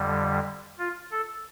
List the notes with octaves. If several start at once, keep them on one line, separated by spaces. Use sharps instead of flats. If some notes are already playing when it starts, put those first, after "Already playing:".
Already playing: F2 D3 G3
F4
A4